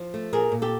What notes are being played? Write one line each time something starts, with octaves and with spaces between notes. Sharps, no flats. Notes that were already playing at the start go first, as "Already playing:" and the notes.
Already playing: F3
A3
A#2 G#4 A#4
A#2
G4 A4